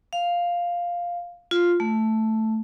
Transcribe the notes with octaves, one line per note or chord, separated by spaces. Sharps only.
F5
F4
A3